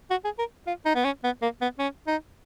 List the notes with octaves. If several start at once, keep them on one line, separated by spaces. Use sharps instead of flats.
F#4
G#4
A#4
F4
D#4
B3
C#4
B3
A#3
B3
C#4
D#4